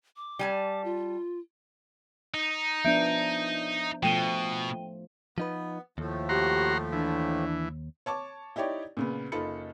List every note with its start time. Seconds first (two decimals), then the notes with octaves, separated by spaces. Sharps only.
0.16 D6
0.39 G3 G#5 A5
0.84 F4
2.34 D#4
2.85 F3 B3 D4 E5 G6 D7
4.03 B2 F3 A3 G5 D#7 G7
5.38 F3 B3 D#4 B4
5.98 D#2 A2 F3 A3
6.29 F#4 G4 A#5 C6
6.92 E3 D4
8.06 C#5 A5 C#6 D6
8.56 D#4 E4 G4 C#5 D5
8.97 A#2 C#3 B3
9.32 F#1 D#4 F4 A4 B5 C#7